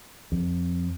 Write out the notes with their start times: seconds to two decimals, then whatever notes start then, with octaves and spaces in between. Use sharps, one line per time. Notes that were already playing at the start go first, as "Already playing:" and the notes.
0.32 F2